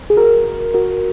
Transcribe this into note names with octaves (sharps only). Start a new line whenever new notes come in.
G#4
F#4 A#4
F#4 A#4